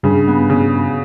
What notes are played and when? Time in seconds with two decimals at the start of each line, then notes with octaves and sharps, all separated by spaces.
0.03 G2 C#3
0.28 B3
0.50 C#3